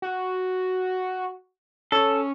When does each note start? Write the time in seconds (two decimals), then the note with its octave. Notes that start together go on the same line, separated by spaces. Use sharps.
0.02 F#4
1.92 C#4 A4